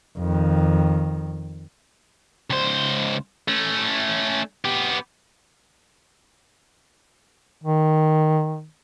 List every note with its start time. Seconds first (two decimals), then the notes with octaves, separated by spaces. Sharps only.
0.18 F2 D#3
2.50 C#2 C5
3.48 A3 C#4
4.65 B3 G4
7.64 D#3